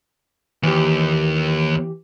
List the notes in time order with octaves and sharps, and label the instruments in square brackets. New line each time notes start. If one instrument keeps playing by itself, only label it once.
[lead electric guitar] D#2 [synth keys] E3 G4